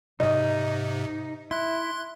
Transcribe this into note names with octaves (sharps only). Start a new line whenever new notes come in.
G#2 C3 D#4 D#5
E4 C6 F#6